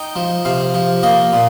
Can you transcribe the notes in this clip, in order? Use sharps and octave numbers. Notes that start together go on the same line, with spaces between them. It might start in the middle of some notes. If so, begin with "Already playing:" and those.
Already playing: D#4 G5
F3
C3 F5
F3
A#3 D#5
A#2